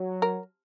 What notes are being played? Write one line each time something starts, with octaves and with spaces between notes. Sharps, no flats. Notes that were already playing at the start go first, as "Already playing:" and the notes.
Already playing: F#3
A#4